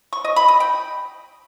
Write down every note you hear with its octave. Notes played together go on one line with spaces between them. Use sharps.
C#6
D#5
B5
D#5
G5